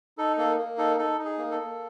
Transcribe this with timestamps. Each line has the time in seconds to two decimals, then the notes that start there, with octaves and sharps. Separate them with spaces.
0.18 D#4 A4
0.38 A#3 A4
0.58 A#3
0.78 D#4 A4
0.98 D#4 A4
1.19 D#4
1.25 G#4
1.38 A#3
1.51 A4
1.58 A#3